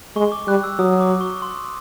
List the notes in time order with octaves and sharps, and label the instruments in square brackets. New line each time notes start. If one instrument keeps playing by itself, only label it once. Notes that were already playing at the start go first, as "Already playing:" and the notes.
[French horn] G#3 [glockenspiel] C#6
[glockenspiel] D6
[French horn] G3 [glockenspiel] F#6
[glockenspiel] E6
[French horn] F#3 [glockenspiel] D#6
[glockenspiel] D6
C#6
C6